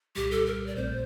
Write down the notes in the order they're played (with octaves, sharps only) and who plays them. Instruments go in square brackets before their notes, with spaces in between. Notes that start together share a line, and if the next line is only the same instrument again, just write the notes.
[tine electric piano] C2 A#2 G3 [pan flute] G4
[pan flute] A4
A#4
D5
[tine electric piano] A#1 A#2 A3 C4 [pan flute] C5